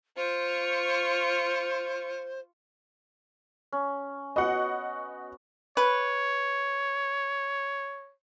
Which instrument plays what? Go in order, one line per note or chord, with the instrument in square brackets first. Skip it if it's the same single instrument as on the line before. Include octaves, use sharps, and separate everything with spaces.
[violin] F4 C#6 [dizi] C5
[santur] C#4
[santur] B3 F#4 [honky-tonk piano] D#5 F#5
[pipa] B4 [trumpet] C#5